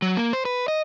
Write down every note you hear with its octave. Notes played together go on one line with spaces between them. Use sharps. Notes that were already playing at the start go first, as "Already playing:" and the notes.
F#3
A#3
C5
B4
D#5